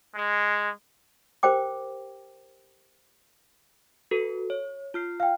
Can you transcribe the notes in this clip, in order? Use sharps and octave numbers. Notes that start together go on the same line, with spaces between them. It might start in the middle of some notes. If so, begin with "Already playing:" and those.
G#3
G4 A#4 C5 G5 D6
F#4 A4 B4
C#5
F4 F6 C7
F5 G5 F6